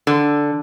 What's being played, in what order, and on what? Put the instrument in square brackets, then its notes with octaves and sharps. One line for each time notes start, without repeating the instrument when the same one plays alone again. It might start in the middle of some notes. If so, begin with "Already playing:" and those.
[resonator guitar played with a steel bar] D3